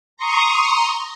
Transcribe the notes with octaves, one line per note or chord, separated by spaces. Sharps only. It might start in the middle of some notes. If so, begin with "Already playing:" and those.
A#5 C6 C#6 D#6